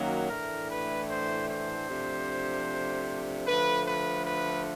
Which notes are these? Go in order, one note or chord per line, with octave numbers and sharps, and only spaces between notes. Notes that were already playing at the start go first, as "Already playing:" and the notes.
Already playing: F#2 D#3 F#3 A#3
A2 E3 A3 D4 A#4
B4
C5
C5
C3 F3 A3 D4
D3 F3 A3 B4
B4
B4